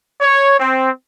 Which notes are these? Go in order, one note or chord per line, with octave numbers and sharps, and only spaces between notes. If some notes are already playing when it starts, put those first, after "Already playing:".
C#5
C4